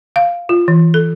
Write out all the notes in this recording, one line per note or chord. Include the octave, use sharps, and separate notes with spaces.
F5
F4
E3
A4